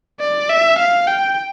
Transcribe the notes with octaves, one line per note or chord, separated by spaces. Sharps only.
D5
E5
F5
G5